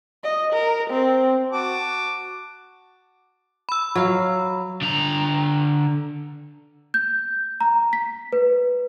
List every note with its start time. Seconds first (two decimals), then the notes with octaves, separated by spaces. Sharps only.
0.23 D#5
0.52 A#4
0.90 C4
1.52 F#4 A5 D6
3.69 B5 E6
3.95 F#3 F5
4.82 D3 A#5
6.94 G6
7.61 A#5
7.93 B6
8.33 B4